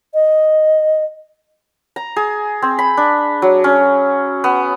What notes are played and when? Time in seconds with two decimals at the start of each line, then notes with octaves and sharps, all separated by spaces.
0.14 D#5
1.96 A#5
2.16 G#4
2.62 C4
2.79 B5
2.97 D4
3.42 F#3
3.64 C#4
4.44 B3